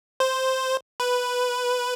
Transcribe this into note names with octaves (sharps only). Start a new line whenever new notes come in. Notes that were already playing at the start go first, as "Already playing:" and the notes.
C5
B4